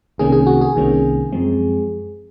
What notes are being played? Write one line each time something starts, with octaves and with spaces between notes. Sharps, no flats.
C2 C3 D#3 A#3 C#4 G#4
G#4
F#4
G#4
C2 C3 D#3 A#3 C#4
F#2 F3 G#3 C4